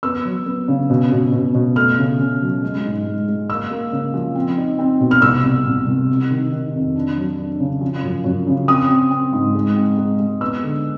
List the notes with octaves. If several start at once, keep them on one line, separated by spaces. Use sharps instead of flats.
B3 E6
F#3
B3
C#3
B2
B2
B2
B2
A3 F6
C#3
C#3
F#3
G#3
G#2
G#3
G#3
A#3 E6
A#3
C#3
F3
C4
D#4
C4
B2
F6
C2 E6
C2
C2
C2
C3
D#3
D#3
F2
D4
F#3
D4
C#3
F3
F#2
F#2
C#3
C4 D#6
C4
C4
G#2
G#3
C4
G#3
G#3
B3 E6
D3